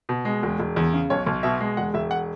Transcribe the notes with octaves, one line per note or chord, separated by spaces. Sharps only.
B2
G#3
E1
E1
E2
C#3
B1 C#5
B1
B2 E5
G#3
E1 F#5
E1 E5
F#5